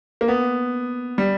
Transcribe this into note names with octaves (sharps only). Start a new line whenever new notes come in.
A#3
B3
G3